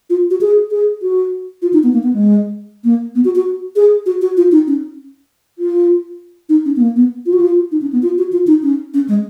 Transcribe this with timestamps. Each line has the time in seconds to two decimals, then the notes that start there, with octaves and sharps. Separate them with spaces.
0.10 F4
0.31 F#4
0.41 G#4
0.71 G#4
1.02 F#4
1.62 F4
1.73 D#4
1.83 B3
1.93 A#3
2.03 B3
2.14 G#3
2.84 A#3
3.15 B3
3.25 F#4
3.35 F#4
3.76 G#4
4.06 F#4
4.22 F#4
4.37 F4
4.52 D#4
4.67 C#4
5.59 F4
6.49 D#4
6.66 C#4
6.76 B3
6.81 A#3
6.96 B3
7.26 F4
7.33 F#4
7.40 F4
7.72 D#4
7.82 C#4
7.93 B3
8.03 F4
8.18 F#4
8.32 F4
8.47 D#4
8.63 C#4
8.94 C#4
9.09 G#3